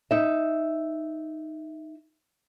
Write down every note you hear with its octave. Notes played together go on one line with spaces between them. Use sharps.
D#4 E5